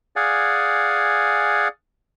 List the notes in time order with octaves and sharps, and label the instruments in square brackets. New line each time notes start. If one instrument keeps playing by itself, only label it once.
[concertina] G#4 D5 F5 F#5 G#5